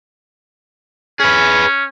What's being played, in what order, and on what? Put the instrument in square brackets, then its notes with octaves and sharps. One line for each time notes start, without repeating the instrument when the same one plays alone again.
[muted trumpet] C#4 [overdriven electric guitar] G#4 B4